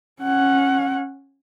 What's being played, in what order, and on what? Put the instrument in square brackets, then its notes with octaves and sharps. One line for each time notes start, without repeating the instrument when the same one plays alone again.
[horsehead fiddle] C#4 F#5